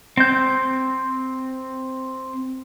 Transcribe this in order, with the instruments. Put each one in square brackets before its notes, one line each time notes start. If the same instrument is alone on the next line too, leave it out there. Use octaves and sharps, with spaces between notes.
[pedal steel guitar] C4 G6